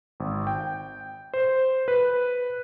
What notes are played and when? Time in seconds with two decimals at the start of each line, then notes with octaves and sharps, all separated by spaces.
0.20 G#1
0.47 G5
1.34 C5
1.88 B4